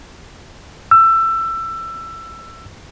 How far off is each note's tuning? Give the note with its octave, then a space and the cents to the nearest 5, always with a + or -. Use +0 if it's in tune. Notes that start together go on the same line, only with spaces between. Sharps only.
E6 +20